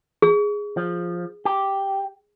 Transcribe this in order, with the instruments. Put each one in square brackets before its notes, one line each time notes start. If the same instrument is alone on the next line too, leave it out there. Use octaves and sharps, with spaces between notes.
[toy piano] G#4
[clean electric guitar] F3
G4